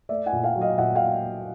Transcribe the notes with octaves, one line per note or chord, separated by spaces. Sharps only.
A3 D5 E5
F#5 G#5
A#2
F5 G5
F#3
D#5 F5
A#2 E5 F#5
F5 G5